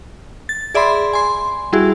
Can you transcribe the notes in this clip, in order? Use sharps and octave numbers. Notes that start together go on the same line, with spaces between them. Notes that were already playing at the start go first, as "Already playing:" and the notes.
A6
G#4 D5 E5 B5 C6
G#5 C6
G3 E4 F#4 G#4